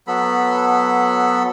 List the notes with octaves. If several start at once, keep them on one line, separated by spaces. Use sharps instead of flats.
F#3 B3 A4 B5